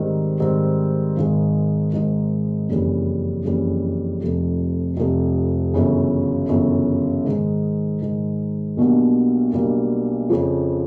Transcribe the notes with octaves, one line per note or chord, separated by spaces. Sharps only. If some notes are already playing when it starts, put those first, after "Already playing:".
Already playing: G#2 D#3 G3 C4
G#2 D#3 G3 C4
G#1 G#2 D#3 G#3
G#1 G#2 D#3 G#3
F#1 F2 C#3 E3 G3
F#1 F2 C#3 E3 G3
F1 F2 C3
F1 F2 C3
G1 F#2 C#3 E3
G1 F#2 C#3 E3
G#2 D#3 G#3
G#2 D#3 G#3
B1 B2 G3 A#3 D4
B1 B2 G3 A#3 D4
F2 C#3 F3